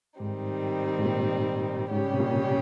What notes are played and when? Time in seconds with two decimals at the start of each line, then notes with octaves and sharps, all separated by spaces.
0.20 G#2 D#3 G3 C4 D#4
0.99 G#2
1.05 A#2
1.91 G#2 C#3 G3 C#4 G4
2.14 C3
2.20 A#2